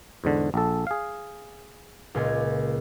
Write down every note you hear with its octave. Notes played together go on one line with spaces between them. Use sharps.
E2 G#2 D3
A#1 A4
G#4 F5
C#2 A#2 G#5